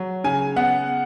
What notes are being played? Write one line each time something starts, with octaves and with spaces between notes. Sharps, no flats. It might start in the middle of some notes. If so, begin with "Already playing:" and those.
Already playing: F#3
C#3 G#5
B3 F#5